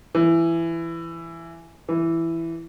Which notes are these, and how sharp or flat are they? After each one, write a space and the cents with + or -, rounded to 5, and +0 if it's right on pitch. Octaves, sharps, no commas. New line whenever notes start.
E3 +15
E3 +5